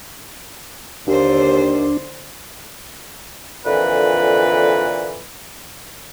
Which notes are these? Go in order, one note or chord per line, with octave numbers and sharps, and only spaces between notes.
D#2 D3 D4 C5
F2 A#2 D3 E3 B4